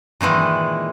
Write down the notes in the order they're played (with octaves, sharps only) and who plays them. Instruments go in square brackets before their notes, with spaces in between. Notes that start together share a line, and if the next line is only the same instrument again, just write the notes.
[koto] A#2 D#3 E3 G#3